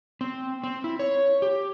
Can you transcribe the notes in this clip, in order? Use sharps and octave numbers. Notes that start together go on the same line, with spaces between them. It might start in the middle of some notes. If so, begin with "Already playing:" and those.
C4
C4
E4
C#5
G4